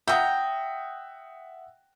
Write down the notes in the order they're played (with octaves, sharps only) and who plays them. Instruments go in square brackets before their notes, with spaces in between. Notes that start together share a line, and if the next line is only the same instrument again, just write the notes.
[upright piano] E5 F#5 D#6 [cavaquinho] G5 A#5